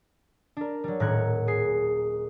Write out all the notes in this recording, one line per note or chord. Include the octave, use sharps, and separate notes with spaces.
D4 A#4
F#3 G3
D#1 A2 A#4 F#6 G#6 C#7
G#4 C7